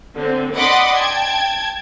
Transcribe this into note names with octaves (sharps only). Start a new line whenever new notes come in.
D3 C4
D5 D#5 F#5 B5 C6 D6
G5 A5 G#6